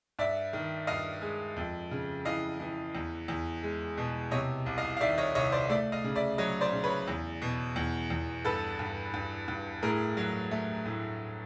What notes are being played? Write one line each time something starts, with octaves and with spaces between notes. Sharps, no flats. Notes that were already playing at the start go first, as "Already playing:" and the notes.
G2 D5 E5
D#3
G2 D#5 F5
G#3
F2
C#3
E3 D#5 F5
E3
E2
E2
G#3
B2
C3 C#5 D#5
C2
D#5 F5
F5
D#3 D5 E5
C#5 D#5
C2 C#5 D#5
C5 D5
A3 D5 E5
D#5 F5
C#3
D5 E5
F#3 C#5 D#5
C5 D5
C#3
B4 C#5
E2
B2
E2
E2
G2 A4 B4
G2
G2
G2
A2 G#4 A#4
F#3
A3
A2